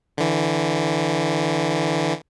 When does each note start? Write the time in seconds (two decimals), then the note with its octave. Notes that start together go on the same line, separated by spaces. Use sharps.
0.17 D3 E3